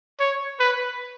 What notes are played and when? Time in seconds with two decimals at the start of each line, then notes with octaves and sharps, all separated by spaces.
0.20 C#5
0.60 B4